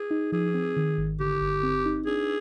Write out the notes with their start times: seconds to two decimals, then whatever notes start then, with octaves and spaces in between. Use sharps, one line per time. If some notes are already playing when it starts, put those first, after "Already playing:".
Already playing: G#4
0.11 D#4
0.32 F3 G#4
0.54 C4
0.76 D#3
0.98 G#1
1.20 D3 G4
1.41 G1
1.63 C4
1.85 D#4
2.06 D4 G#4